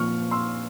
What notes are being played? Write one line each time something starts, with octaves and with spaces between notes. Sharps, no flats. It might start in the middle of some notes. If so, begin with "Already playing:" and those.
Already playing: A#2 F3 C#6 F6
C6 E6